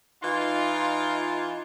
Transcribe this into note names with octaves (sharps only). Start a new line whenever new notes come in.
E3 D#4 F4